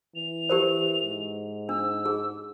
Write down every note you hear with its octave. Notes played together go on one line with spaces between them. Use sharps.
E3 F7
G4 A#4 C5
G#2
D4 E6
G#4